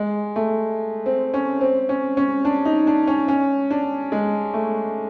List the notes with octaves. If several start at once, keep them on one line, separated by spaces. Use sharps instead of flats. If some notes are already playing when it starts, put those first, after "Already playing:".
Already playing: G#3
A3
C4
C#4
C4
C#4
C#4
D4
D#4
D4
C#4
C#4
D4
G#3
A3